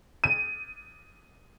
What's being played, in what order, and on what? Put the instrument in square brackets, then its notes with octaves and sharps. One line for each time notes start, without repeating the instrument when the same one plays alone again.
[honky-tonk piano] D#7